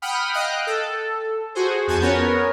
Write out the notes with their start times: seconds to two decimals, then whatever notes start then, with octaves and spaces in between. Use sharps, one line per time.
0.02 F#5 G5 B5 D#6 F6
0.34 D#5 F5 G5 F#6
0.67 A4
1.55 F#4 G#4 C5
1.87 F2 F#4 G#5 A5 G6
2.01 B3 C#4 A#4 C#5